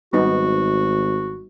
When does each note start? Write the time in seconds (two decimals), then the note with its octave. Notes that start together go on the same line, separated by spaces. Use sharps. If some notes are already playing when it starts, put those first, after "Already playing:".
0.13 G#1 G3 B3 D#4 F#4